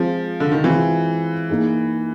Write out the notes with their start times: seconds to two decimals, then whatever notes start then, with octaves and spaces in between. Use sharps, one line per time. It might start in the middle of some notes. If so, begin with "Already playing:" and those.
Already playing: F3 G#3 C4 F4
0.40 D3
0.52 D#3
0.64 E3 G#3 C4 F4
1.49 A#3 D#4 G#4